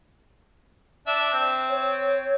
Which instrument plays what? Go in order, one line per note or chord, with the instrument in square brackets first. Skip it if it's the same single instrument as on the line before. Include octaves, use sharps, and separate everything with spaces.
[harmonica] D4 E5
C4
[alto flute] C#5